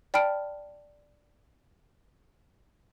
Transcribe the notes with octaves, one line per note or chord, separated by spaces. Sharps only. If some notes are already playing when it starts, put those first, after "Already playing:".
D5 G5 A5 B5 F6 D7